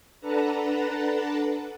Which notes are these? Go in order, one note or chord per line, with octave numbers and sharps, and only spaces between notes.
D4 A4 B4 F#5 A5 A#5